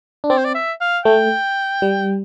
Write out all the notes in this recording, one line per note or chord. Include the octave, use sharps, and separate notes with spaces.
D4
C4 D5
C5
D5
E5
F5
A3 G5
G3